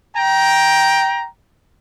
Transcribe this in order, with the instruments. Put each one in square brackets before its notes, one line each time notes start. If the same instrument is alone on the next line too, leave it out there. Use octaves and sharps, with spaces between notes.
[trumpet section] G5 A#5